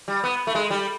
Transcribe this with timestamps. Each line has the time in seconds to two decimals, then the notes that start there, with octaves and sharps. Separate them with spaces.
0.08 G3
0.24 B3
0.47 A3
0.55 G#3
0.70 G3